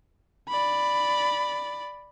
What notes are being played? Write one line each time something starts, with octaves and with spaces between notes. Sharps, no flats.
D5 B5